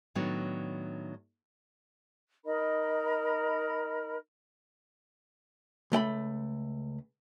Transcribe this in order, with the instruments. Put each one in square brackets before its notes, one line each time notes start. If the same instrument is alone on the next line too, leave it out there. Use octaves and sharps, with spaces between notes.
[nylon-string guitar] A2 D#3 F#3 B3 D4
[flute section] D#4 A#4 D#5 B5
[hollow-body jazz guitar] C#2 A3 G5 B5